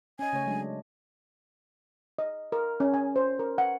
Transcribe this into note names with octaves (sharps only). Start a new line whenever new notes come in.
C#4 D#5 G#5
C#3 A3 C#5
F#3 G#3 D4
D#5
A#4
C#4
G#5
C5
A#4
F#5